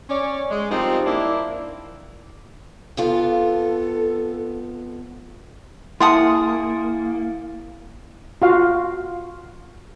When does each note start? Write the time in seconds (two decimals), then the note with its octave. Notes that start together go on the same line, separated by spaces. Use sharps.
0.08 C#4 C#5 D5
0.49 G#3
0.69 F3 G3 G#3 A#3 C4 D#4
1.06 A#3 D4 E4
2.97 F2 B3 F4 A4
6.00 A#3 E4 G#4 F#5 A5 C6 D#6 A6
8.42 F4 F#4 F5